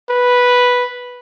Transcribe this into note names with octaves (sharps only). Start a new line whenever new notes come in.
B4